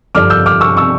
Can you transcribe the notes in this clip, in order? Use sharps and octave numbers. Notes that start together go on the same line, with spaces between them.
G2 D3 F3 D6 F6
E6 G6
D6 F6
C#6 E6
C#6 E6